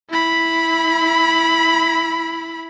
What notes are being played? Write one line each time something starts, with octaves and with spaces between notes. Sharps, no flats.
E4 B5